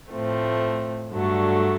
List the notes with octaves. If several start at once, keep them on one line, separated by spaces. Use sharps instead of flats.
A2 F3 A3 C4
G2 D3 F#3 A3